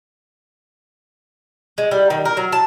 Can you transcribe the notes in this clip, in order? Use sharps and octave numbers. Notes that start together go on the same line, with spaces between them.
G#3
G3
D#3
A#4
F#3
A5